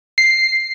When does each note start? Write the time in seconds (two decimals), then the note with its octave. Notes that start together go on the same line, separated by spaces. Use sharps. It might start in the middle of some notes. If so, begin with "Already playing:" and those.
0.18 C7